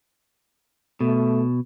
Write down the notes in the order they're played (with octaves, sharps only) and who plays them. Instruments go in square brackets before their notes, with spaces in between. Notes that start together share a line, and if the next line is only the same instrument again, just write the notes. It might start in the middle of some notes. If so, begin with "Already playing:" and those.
[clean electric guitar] B2 [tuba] A3